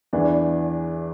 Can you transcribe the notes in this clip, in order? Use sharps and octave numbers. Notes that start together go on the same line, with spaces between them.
E2 E3 D4